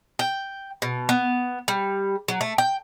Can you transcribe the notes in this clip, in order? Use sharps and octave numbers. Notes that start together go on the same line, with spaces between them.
G5
B2
B3
G3
F#3
A3
G5